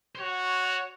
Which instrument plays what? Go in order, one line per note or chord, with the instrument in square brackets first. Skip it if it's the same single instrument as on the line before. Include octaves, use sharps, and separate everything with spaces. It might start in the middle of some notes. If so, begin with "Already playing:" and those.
[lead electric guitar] C5
[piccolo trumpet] F#4 [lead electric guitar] C#5